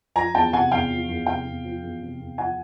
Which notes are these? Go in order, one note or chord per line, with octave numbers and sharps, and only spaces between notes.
F3 G#5 A#5
E2 G5 A5
C3 F#5 G#5
E2 F5 G5
F3
E2
C3 F5 G5
E2
F3
E2
C3
E2
F3 F#5 G#5